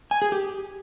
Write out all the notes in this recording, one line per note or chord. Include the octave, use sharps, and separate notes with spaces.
G#5
G#4
G4